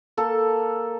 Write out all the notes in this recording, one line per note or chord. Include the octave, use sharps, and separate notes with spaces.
A#3 A4